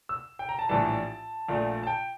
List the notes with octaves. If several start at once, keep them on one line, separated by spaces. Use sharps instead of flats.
E6
G5
A#5
A5
A#1 A2 E3 G3 A5
A#1 A#2 A3
A5
G5